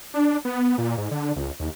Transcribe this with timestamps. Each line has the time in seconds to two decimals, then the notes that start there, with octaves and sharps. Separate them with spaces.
0.14 D4
0.45 B3
0.78 A#2
0.98 G#2
1.11 D3
1.36 C#2
1.60 D#2